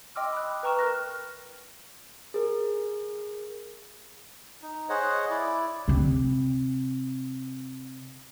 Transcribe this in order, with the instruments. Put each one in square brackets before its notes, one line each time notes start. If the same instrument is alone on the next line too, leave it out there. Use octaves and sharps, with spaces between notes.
[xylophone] D#5 G5 C6 D6 E6 F6
B5 D#6 F#6
B4 G5 A#5 C#6 F6 E7
A#4 F6 F#6 A#6
[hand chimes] G#4 A#4
[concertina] D#4
G#4 C5 C#5 D#5 F#5
E4 D5
[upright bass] C3 C4